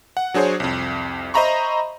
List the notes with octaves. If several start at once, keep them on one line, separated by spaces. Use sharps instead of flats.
F#5
F#3 D4 G#4 C5 C#5
C2 F2
C5 D#5 E5 A#5 B5 C#6